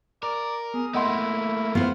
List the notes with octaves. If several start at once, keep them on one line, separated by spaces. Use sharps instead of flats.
A#4 D5
B3 G#4
A3 A#3 E4 D#5 F#5 C6
B3 F4 C5